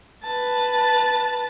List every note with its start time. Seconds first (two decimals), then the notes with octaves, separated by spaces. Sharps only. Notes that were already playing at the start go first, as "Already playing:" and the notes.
0.24 B4 A5